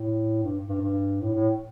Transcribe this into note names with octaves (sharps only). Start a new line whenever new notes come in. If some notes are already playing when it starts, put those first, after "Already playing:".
Already playing: A2
G2
G2
G2
A2
A2